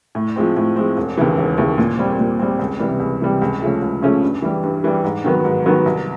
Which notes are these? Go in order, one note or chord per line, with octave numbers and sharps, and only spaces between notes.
A2
F3 G#3 C4
A2
F3 G#3 C4
E1
D#2 C#3 E3
E1
D#2 C#3 E3
A#2
G3 C4
A#2
G3 C4
C#2
C3 E3 G3
C#2
C3 E3 G3
C#2
C#3 F3 A3 C#4
C#2
C#3 F3 A3 C#4
G2
E3 G3
G2
E3 G3
G#2
D#3 F#3 B3
G#2
D#3 F#3 B3
C2